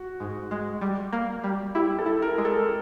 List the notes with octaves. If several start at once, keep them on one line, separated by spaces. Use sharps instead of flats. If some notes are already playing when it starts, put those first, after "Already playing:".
Already playing: F#4
G#2
G#3
G3
A#3
G3
E4 G4
A4
E4
A#4
G#3
A4